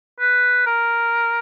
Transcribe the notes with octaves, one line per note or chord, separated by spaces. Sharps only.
B4
A#4